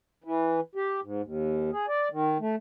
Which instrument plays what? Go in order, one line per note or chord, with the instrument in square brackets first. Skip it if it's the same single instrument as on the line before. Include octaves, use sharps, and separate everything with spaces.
[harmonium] E3
G4
G#2
D#2
G#4
D5
D#3
A3